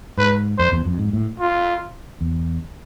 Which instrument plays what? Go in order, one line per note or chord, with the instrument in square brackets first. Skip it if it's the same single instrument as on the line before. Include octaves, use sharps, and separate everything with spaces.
[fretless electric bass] G#2 [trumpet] B4
[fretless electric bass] F2 [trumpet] C5
[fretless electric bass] E2
F2
G#2
A2
[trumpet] F4
[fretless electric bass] E2